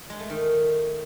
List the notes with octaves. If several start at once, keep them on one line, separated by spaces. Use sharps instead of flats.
G#3
A3
D#3